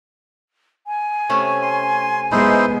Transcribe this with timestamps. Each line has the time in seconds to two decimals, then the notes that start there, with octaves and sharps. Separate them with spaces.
0.87 G#5
1.29 C3 A3 C#4
1.62 C6
2.32 B2 G#3 B3 D#4 E4 G#4 C5